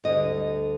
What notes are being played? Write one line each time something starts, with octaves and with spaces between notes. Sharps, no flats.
D2 D3 G3 D#5